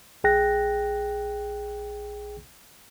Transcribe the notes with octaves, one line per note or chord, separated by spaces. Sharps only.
A#1 G#4 G5 F#6 A#6